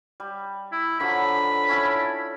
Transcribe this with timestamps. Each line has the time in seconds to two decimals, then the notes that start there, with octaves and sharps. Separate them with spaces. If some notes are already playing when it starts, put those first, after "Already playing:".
0.20 G3
0.72 E4
1.00 D3 F3 F#3 B5
1.69 C#4 E4 A5